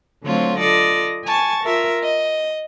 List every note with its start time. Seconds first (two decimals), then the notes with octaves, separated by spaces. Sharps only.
0.23 D3 F#3 A3 C4 F4 C#5
0.58 F4 A4 D5 D#5
1.24 G#5 A5 C#6
1.63 F4 A#4 E5
2.03 D#5